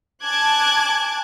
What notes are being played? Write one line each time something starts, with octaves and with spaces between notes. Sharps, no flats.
G#5 A5 D6 F#6 G#6